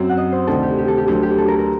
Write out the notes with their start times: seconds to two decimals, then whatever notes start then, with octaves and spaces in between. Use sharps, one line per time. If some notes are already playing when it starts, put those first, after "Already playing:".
Already playing: F#2 F#3 C4
0.09 F#5
0.17 D#5
0.32 C5
0.47 D2 C3 D#3 G3 A4
0.63 G4
0.78 G4
0.88 A4
0.98 G4
1.08 D2 D3 F#3 G4
1.23 G4
1.38 A4
1.48 A#4
1.59 A#4